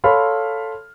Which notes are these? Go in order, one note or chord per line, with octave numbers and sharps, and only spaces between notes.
A4 C#5 F5 B5 C6 F6